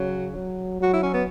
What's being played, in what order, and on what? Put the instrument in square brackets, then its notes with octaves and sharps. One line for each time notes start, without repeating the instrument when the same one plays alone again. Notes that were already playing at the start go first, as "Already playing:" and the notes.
Already playing: [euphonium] C#3 [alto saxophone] F#3
[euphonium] F#3
[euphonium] F#3 [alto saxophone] F#4
[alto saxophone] E4
C#4
B3